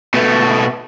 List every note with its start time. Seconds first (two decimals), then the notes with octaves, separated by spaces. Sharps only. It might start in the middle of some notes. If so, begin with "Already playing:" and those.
0.14 B2 A3